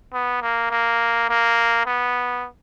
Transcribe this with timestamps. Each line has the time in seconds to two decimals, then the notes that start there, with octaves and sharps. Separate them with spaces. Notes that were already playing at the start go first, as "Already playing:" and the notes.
0.13 B3
0.42 A#3
0.71 A#3
1.29 A#3
1.86 B3